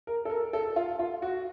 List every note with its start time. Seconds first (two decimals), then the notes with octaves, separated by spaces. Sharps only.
0.07 A#4
0.25 A4
0.30 A#4
0.53 A4
0.76 F4
0.99 F4
1.22 F#4